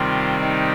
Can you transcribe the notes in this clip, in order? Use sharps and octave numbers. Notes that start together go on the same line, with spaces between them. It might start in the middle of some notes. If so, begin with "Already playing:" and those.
Already playing: C3 D#3 G3 C4 F4
D#4